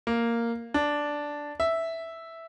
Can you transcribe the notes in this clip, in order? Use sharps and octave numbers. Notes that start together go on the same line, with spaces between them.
A#3
D4
E5